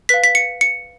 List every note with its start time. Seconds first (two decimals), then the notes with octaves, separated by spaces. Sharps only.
0.09 B4 F5 B6
0.24 B6
0.35 C#7
0.61 C#7